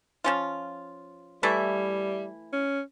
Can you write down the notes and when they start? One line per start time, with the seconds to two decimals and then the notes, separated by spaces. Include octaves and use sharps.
0.24 F3 C#4 F4
1.43 E3 G3 A3 E4
2.53 C#4